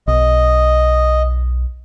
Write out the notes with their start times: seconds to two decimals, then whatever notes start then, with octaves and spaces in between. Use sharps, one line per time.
0.07 B1 D#5